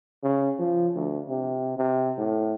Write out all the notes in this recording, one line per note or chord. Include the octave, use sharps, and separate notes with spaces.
C#3
F3
D2
C3
C3
A2